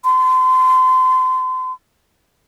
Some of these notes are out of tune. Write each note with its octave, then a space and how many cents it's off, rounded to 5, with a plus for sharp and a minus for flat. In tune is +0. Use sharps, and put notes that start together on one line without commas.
C6 -30